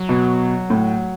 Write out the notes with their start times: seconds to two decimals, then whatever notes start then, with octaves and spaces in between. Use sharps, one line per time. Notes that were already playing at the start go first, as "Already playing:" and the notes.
Already playing: F#3
0.09 B2
0.70 A2